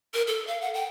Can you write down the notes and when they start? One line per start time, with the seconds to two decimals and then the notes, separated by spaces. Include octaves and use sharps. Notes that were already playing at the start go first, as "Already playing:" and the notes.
0.14 A#4
0.27 A4
0.47 F5
0.61 F#5
0.74 G5